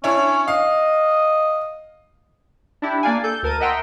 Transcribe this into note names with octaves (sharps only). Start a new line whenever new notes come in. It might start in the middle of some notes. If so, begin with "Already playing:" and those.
C#4 D4 E4 C#5
D#5 F5
D4 E4 G4
A#3 D4 D5 F5 G#5
A4 G6
D2 A#4 A5 D#7
D#5 E5 F#5 G5 A#5 C6